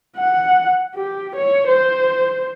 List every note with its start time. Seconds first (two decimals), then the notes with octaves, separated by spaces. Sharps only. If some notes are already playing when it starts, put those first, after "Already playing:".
0.17 F#5
0.95 G4
1.36 C#5
1.67 C5